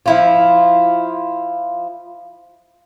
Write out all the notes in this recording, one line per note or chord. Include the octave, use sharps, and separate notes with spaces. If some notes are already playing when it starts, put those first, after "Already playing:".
F3 E4 F4